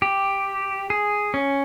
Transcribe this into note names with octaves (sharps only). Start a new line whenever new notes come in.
G4
G#4
C#4